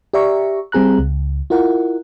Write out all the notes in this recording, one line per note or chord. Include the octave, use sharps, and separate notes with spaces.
G4 D5 E5 A#5 C#6
G3 C4 G#4 A#5 F#6
C#2
E4 F4 A#4 F#5